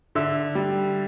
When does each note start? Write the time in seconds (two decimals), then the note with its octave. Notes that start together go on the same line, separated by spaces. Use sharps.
0.15 D3 E5 E6
0.55 G3